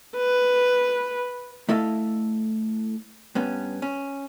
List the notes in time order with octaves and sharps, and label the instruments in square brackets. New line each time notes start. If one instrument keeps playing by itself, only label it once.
[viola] B4
[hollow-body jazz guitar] A3 E4 A4 D#5 F5
G2 B3 C#4
C#4